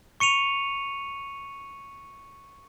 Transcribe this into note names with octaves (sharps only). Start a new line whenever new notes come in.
C#6 C#7 D#7 F7